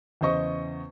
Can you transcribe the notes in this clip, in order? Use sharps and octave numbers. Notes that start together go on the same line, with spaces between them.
E2 C#3 C5 D#5 C#6